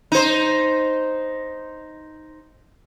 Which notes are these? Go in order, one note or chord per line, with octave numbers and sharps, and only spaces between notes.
D#4 C5